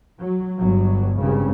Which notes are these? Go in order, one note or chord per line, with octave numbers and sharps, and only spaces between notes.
F#3
G1 F#3
G#1 G2 C#3